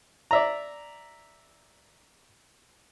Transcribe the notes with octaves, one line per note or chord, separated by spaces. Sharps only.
D5 E5 A#5